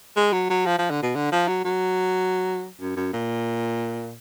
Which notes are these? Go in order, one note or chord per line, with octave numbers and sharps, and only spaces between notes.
G#3
F#3
F#3
F3
F3
D3
B2
D3
F3
F#3
F#3
F#2
F#2
A#2